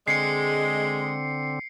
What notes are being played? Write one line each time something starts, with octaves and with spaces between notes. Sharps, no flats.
D3 G#3 C4 C7 C#7